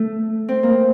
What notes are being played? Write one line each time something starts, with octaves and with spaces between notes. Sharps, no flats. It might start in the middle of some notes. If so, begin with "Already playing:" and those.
Already playing: A3
C4
A#3